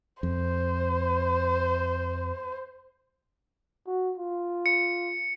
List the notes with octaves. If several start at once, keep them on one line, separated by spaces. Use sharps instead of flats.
F2 C5
F#4
F4
C#7